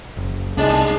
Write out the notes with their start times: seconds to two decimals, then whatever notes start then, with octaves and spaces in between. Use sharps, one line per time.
0.17 F#1
0.58 C2 G#3 D4 D#4 A5